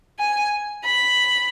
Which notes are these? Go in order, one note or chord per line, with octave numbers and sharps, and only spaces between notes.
G#5
B5